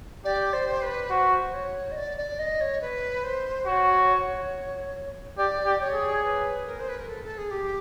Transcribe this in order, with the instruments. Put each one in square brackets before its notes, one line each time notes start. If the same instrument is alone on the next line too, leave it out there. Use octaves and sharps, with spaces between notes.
[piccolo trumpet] G4 [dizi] D5
[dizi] C5
B4
[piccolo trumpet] F#4 [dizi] C5
[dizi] C#5
D#5
D5
D5
D#5
C#5
B4
C5
[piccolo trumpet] F#4 [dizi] C#5
[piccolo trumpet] G4 [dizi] D5
[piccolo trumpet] G4
[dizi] C#5
[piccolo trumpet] G#4
[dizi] B4
A#4
C5
B4
A#4
A4
A4
G#4
G4